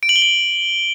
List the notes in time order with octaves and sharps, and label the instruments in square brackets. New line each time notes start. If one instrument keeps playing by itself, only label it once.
[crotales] D7
F#7
G7
D7